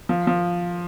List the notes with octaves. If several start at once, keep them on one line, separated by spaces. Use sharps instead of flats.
F3
F3